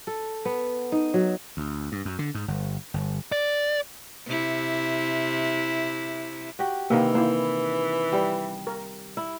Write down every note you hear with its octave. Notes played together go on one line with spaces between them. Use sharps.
A4
B3
D#4
F#3
D2
G2
F#2
D3
G#2
G1
G1
D5
C3 E4
F#4 G4
C3 D#3 E3 A#3
A#3 E4 C5
G3 G4
A#4
E4